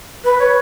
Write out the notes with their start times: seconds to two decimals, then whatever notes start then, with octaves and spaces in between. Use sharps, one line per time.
0.24 B4
0.39 C#5